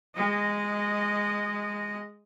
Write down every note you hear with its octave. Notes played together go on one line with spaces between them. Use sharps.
G#3 D#5